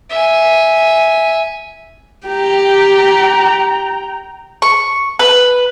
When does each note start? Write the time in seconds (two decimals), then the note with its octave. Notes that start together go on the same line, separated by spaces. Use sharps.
0.10 E5 G#5
2.27 G4 G5 A#5
4.62 C#6
5.19 B4